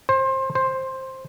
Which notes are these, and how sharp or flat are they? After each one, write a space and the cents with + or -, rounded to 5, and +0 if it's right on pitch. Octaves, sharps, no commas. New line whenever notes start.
C5 +25
C5 +10